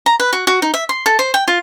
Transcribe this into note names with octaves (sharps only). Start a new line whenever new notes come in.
A#5
B4
F#4
F#4
D#4
E5
C6
A4
C5
G5
F4